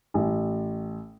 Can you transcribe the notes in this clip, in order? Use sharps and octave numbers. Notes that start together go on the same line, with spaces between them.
A1